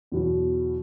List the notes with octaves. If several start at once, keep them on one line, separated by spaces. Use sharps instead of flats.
E2 B2 F#3